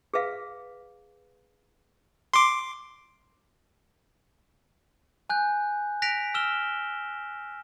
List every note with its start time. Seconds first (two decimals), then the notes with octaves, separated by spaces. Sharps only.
0.14 G#4 B4 E5 F5
2.34 C6 D6
5.30 G#5 F#6 G6
6.02 F#6 A#6 B6 D7 F7
6.34 E6 F6 E7 G7